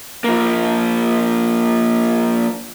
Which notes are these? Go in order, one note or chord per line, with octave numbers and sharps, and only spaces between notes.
F3 A#3